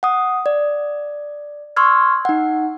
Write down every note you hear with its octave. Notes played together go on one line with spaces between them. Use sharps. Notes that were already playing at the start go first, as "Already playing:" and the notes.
F#5 D#6
D5
C6 C#6 E6 F6 G#6
D#4 F#5